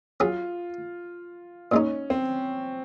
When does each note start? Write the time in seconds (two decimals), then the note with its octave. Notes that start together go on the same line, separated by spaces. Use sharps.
0.20 F#3 C#4 F4 G#4
1.72 A#2 G#3 C#4 D#4
2.10 C4